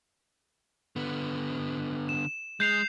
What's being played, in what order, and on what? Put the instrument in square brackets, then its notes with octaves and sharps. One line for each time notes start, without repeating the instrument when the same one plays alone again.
[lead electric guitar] D3 B3
[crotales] E7
[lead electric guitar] G#3 [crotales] G6 C7 F7